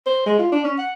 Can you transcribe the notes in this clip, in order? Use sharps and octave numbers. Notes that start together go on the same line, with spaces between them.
C5
G#3
F4
D4
C#4
F#5